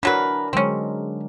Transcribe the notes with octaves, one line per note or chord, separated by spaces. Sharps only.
E3 F#3 D4 A#4 B4
D3 F#3 G#3 C4 C#4